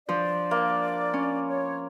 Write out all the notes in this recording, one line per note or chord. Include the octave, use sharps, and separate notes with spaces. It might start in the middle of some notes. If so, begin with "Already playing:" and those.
F3 D4 C5 D5
A#3
C#4
C#5